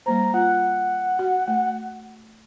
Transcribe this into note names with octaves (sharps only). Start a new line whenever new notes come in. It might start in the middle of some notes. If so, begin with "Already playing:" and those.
G3 A#3 C5 A#5
F4 F#5
F#4
A3